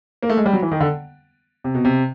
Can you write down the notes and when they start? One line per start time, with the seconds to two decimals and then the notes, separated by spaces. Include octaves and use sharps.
0.23 A#3
0.29 A3
0.37 G#3
0.46 G3
0.53 F#3
0.62 E3
0.71 D#3
0.80 D3
1.64 C3
1.74 B2
1.85 C3